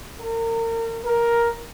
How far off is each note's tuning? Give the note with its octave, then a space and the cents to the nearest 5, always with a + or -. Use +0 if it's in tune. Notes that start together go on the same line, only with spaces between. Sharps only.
A#4 -35
A#4 +10